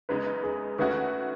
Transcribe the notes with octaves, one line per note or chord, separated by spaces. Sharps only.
F#2 C#3 G#3 B3 D#4 B4
G#4
D#3 A3 C#4 F#4 B4